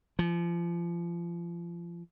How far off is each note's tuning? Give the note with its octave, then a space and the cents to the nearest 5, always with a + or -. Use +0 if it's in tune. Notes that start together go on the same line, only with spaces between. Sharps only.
F3 -30